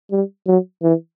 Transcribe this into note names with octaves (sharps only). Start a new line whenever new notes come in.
G3
F#3
E3